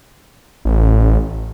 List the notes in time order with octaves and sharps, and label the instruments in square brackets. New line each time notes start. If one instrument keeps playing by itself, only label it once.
[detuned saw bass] A1